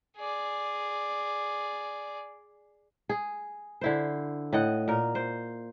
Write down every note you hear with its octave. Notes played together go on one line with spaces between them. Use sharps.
G#4 D5
G#4
D3 E4 C5
A2 D#5 F#5
A#2 A#4
C5